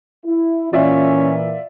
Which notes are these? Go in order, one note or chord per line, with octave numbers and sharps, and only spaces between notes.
E4
A#2 E3 C#4 F4 D5 E5